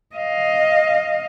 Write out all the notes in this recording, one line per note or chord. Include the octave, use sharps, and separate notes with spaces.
D#5 F5